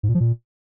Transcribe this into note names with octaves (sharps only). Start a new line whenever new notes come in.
G#2
A#2
F3
A#2